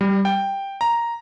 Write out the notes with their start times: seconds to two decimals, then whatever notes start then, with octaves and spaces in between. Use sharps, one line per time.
0.01 G3
0.25 G5
0.81 A#5